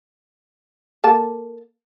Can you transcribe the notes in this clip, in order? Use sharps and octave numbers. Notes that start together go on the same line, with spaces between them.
A#3 A4 A5